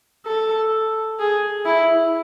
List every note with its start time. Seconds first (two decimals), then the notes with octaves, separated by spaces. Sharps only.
0.26 A4
1.19 G#4
1.66 E4